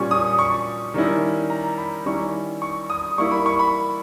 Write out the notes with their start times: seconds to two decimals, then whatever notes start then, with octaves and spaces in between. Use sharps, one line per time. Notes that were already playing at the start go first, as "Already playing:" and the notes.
Already playing: A#2 G3 C#4 C#6
0.11 D#6
0.39 C#6
0.94 D#3 G3 C#4 E4
1.50 A#5
1.78 B5
2.06 D#3 G3 C#4 E4 C#6
2.62 C#6
2.90 D#6
3.18 G3 A#3 E4 C#6
3.31 B5
3.46 C#6
3.59 B5